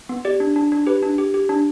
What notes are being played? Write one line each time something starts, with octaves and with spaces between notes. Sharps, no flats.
B3
G4 D5
D4
D4
D4
G4 B4
D4
G4
G4
D4